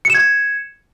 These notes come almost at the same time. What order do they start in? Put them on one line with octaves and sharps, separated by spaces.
C#7 E7 G#6